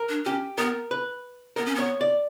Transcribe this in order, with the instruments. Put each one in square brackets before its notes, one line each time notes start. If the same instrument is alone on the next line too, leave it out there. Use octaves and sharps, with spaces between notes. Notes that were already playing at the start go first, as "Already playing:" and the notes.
Already playing: [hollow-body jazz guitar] A#4
[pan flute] D4
[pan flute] C#4 [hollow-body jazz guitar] G4
[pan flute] B3 [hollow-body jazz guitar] A#4
[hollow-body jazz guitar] B4
[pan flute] B3 [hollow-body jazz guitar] A#4
[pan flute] C#4
[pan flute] B3 [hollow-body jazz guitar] C#5
[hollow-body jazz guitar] D5